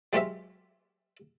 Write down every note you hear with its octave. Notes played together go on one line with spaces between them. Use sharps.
F#3 G#3 F4 G4 C5 E5